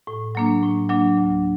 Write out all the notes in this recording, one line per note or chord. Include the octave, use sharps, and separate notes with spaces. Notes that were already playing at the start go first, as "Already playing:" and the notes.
A2
F#3 A#3 D4
A2
F#3 A#3 D4
D2